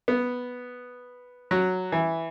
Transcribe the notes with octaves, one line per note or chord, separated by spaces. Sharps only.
B3
F#3
E3